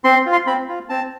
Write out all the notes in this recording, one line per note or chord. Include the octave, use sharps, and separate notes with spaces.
C4 C6
F4
C6
C4 B5
F4
C4 A5